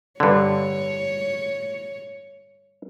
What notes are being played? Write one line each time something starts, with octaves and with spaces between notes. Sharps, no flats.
G2 D3 C#5